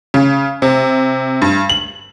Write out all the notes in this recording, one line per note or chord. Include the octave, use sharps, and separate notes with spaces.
C#3
C3
G2
F#7